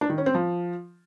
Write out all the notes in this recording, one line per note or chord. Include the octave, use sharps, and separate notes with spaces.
D4
D#3
C#4
C4
F3